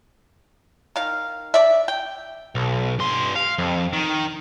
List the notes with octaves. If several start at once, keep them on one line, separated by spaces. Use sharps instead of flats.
D#3 F5
D5 E5
G5
B1
G2 C6
F5
F2
D#3